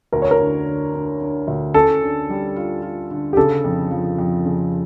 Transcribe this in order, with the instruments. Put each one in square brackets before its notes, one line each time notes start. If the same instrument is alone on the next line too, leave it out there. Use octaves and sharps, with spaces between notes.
[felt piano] D2 [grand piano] A#4
[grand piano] C#5
A#4
[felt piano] D3
D3
D3
D3
D2
[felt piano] C#4 [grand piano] A4
[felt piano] D3
G3
F4
F4
D3
[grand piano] G4
[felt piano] C#3 [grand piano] A4
[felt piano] F2
F3
F2
C#3